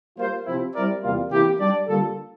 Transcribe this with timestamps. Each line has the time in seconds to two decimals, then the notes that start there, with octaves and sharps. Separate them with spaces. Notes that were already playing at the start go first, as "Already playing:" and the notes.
0.17 G3 A#3 F4 C5
0.46 C3 F3 C4 E4
0.74 G3 C4 E4 A#4 D5
1.02 E2 C3 G3 A#3 F4
1.31 C3 E3 A#3 E4 G4
1.60 G3 D4 G4 D5
1.88 D3 G3 A#3 F4 A4